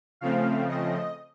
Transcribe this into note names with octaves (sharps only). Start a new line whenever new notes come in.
C#3 F3 A3 C4 F5
D#5